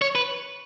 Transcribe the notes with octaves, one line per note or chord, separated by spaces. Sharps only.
C#5
B4